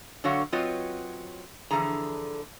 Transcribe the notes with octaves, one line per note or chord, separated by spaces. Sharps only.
D3 F#3 F#4 C#5 F5 F#5
F#3 C4 F4 B4 C#5 D#5
D3 E3 F3 G#4 A#5